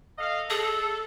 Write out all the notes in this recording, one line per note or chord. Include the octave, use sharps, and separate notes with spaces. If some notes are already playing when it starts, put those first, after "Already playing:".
A4 D#5 F5
G#4 A4